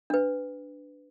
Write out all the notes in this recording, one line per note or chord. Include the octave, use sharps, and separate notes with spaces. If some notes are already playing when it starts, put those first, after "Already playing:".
D4 B4